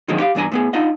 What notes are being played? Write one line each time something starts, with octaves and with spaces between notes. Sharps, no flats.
D3 D#3 F3 F#3 G#3 C4
G4 F5
E2 G2 D4 G#5 A#5
A2 B3 G#4
D4 D#4 F4 D#5 F#5